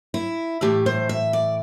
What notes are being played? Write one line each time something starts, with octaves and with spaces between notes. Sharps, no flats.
E4
A2 E3 A3 G4
C5
E5
D5